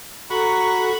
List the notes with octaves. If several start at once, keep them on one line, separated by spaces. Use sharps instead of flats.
F#4 A4 A#5 B5 C#6